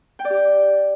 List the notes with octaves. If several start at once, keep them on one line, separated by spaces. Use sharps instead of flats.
G5
D5
G4